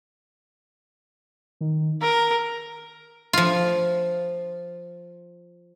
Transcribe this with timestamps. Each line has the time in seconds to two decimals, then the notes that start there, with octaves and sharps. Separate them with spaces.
1.61 D#3
2.01 A#4 A#5
3.33 F3 F4